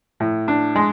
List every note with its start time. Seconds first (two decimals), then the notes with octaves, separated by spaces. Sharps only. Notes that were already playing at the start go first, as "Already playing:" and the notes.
0.20 A2
0.48 D4
0.76 G#3